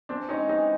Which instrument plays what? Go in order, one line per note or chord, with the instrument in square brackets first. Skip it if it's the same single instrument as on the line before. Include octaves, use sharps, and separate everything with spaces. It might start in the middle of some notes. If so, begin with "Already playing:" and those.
[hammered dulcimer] E3 [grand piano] C4 D4
[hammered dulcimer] G#3 C4 [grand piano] C#4 D#4
[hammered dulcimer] E3 [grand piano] C#4 D#4